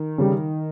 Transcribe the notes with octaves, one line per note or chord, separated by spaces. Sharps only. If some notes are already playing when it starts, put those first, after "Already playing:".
Already playing: D#3
C#3 G3